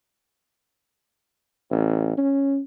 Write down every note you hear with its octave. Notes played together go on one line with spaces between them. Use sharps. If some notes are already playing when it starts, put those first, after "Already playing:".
A1
C#4